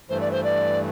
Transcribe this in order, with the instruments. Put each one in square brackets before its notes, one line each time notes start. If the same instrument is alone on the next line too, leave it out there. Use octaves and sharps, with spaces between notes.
[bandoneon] G2 E3 A3 [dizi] C5
[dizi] D5
C5
D5